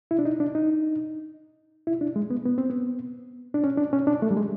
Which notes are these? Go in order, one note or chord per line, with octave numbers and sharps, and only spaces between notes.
E4
D4
D#4
D4
D#4
E4
D4
G#3
B3
B3
C4
B3
D4
C#4
D4
C#4
D4
A3
G3
G#3